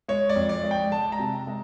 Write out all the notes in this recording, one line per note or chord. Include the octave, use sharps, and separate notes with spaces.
G#3 C#5
D5
F2
D5
G#3
G5
G#3 A5
A#5
C3
G#3